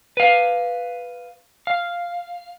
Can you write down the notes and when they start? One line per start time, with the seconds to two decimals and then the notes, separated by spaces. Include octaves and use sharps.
0.17 B4 F5
1.67 F5